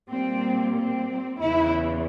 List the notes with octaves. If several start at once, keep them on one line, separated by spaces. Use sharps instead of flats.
A#2 G3 A#3 C4
C4
E2 C#3 E3 E4